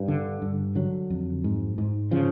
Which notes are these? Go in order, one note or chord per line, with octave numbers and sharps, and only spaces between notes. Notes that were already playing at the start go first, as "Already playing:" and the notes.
Already playing: G2
D3
G2
D3 F#3
F2
G#2
G#2
C#3 F3